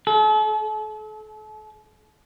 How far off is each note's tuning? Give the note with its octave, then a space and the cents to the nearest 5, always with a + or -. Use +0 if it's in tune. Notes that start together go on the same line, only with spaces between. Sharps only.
A4 -40